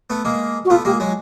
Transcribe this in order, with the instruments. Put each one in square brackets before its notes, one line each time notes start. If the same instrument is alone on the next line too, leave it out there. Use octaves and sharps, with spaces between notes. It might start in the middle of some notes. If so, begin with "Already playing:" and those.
[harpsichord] A3 B3
G#3 A#3
[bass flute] F#4
[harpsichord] A3 B3 [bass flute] F4
[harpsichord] G#3 A#3 [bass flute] G4
[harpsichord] F#3 G#3